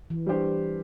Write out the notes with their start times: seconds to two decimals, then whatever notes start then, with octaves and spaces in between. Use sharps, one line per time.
0.10 E3
0.26 G3 D4 G4 C5